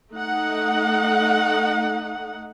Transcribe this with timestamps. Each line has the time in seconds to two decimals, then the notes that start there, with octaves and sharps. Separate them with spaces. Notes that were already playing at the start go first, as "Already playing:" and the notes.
0.12 A3 D#4 F#5